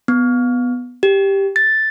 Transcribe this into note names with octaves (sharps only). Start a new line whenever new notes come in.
B3
G4
A6